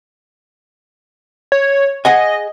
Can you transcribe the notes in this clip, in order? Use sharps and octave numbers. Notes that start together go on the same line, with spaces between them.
C#5
G#4 D#5 F#5 G#5